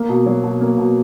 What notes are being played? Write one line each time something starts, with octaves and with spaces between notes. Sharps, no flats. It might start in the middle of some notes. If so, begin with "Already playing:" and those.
Already playing: A#3
B2
F#3
B2
A#3
B2